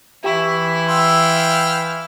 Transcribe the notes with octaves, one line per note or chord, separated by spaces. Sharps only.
E3 E4 G4 G5 C#6
F5 G5 C6 E6